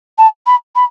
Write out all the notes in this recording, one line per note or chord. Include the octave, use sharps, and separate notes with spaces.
A5
B5
B5